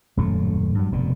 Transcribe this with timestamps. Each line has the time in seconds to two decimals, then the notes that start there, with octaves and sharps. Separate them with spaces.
0.17 D#1 F#2 A2 A3
0.75 G2 F#3
0.92 F1 B2 D3